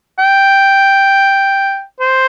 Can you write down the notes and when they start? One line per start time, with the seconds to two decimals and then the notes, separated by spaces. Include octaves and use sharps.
0.19 G5
2.00 C5